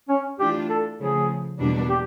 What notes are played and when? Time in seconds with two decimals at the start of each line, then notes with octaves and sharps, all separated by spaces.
0.09 C#4
0.39 E3 A3 D4 F4 G4
0.69 A4
0.99 C#3 F3 A3 G#4
1.58 E2 B2 G3 A#3 D4
1.89 G4